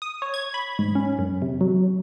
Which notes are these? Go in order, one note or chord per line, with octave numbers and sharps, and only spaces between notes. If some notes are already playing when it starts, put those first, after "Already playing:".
D#6
C#5
G#6
B5
G#2
C#4
F#2
C3
F#3